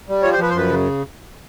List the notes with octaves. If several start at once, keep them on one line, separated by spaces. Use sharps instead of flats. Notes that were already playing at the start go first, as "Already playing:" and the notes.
G3
F3 C#5
C5
F3 B4
C5
F#2 B4
C#3